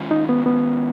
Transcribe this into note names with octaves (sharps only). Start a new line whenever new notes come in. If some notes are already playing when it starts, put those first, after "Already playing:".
Already playing: D#3 G#3 C#4 F4
D#4
B3
B3